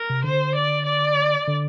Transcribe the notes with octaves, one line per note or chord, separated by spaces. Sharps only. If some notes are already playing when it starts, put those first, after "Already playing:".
Already playing: A#4
C3
D3 C5
D5
D5
D3